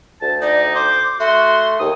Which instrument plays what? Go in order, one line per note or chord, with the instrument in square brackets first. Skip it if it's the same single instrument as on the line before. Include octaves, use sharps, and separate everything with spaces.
[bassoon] D2 [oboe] A5
[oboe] D#4 [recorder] D5
[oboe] C5 [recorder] D6
[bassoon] A3 [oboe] F#4 [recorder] C6
[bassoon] D#2 [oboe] D#6